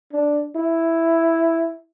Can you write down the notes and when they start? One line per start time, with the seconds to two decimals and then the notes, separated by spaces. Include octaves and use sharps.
0.13 D4
0.56 E4